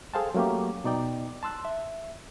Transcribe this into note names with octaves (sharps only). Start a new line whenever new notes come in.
G#4 A4 C5 F5 G5 A5
F#3 A3 A#3 C#4 G4
B2 D#4 D5 G5
A5 C6 E6 F#6
E5